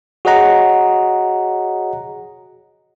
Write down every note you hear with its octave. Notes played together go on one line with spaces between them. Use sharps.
F#4 G#4 C#5 D#5 F#5 A#5